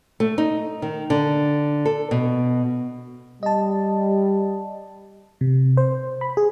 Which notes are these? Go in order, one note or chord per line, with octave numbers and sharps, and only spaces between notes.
A3
D#4
D#3
D3
A4
B2
G3 D#5 A5
C3
C5
B5
G#4